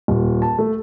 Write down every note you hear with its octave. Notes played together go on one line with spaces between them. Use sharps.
D#1
A5
A3